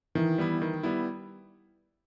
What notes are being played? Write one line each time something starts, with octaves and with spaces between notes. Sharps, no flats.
D#3 E3
G3 B3 E4
D#3
G3 B3 E4